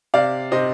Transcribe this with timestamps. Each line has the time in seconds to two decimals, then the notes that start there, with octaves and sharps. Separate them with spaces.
0.14 C3 D5 F5
0.52 C3 C5 D#5